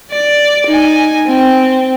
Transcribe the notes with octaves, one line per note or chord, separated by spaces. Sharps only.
D5
D#4 G#5
C4